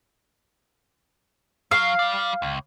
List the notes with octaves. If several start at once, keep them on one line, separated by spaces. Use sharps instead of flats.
F#2 F#3 F5
G3 D5
C#2